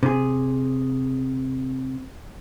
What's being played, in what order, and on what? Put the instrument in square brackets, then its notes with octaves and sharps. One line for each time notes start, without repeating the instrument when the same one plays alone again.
[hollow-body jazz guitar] C3 G#4